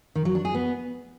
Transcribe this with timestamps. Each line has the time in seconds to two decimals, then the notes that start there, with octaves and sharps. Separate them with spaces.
0.15 D#3
0.25 F#3
0.35 D4
0.45 G#4
0.55 B3